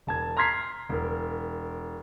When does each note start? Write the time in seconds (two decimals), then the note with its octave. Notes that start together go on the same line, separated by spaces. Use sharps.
0.07 E1 A5 G#6
0.37 A#5 C6 F6 G#6 B6 C7
0.89 E1 A#4